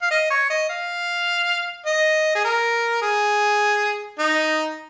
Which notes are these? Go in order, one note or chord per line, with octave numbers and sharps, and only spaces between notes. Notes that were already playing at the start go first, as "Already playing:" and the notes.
F5
D#5
C#5
D#5
F5
D#5
G#4
A#4
G#4
D#4